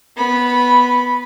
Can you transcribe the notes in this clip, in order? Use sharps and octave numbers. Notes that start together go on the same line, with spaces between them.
B3 B5